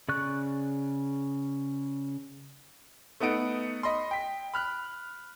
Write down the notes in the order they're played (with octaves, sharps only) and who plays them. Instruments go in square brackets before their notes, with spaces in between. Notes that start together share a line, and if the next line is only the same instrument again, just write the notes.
[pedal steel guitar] C#3 D5 C#6 F#6
[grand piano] A3 B3 D#4 F#5 D7
D#5 B5 C6
G5 B6
B5 F6 F#6